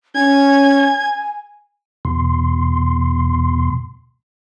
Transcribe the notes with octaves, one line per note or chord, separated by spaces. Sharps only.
C#4 G#5 G#6
E2 B2 C6